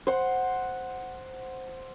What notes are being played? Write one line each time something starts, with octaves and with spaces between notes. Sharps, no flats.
C5 F#5